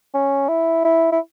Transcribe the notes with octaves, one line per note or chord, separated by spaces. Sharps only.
C#4
E4
E4
E4